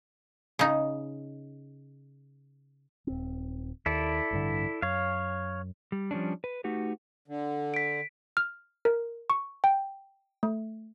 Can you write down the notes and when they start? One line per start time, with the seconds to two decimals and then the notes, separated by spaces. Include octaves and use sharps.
0.59 C#3 D#4
3.07 D#1 C4
3.86 D#2 E4 A4 D5
4.31 A1 G2 D3
4.82 F#2 C#5 F5
5.92 G3
6.11 F3 G3 C#4 D4
6.44 B4
6.64 A3 D#4 F#4 G4 B4
7.28 D3
7.74 B6 D7
8.37 F6
8.85 A#4
9.30 C#6
9.64 G5
10.43 A3